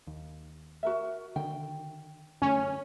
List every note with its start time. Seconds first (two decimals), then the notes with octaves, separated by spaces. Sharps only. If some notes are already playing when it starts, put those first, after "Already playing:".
0.07 D#2
0.83 F#4 A#4 E5
1.36 D3 D#3 G5
2.42 F#2 D3 A3 C#4